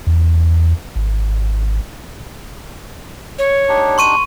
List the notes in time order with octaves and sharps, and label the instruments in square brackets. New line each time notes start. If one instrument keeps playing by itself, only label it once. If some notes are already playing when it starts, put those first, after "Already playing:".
[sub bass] E2
G#1
[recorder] C#5
[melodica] D4 D#4 G4
[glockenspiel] C6 C#6 D#7